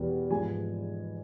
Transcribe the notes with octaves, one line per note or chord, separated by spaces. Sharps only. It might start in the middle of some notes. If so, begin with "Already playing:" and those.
Already playing: E2 B2 G3
G#2 F3 G#3 G#5